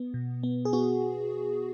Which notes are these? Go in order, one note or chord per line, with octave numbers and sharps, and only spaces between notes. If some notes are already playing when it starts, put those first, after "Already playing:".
Already playing: B3
B2
B3
G#4
B3 F#4